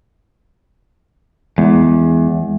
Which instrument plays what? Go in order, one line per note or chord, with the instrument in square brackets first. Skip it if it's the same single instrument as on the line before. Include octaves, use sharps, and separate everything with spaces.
[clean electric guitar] E2 [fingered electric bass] G#3